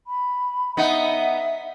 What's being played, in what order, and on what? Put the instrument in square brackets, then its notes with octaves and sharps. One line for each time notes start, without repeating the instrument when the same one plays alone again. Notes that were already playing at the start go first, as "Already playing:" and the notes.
[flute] B5
[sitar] B3 D#4 [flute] E5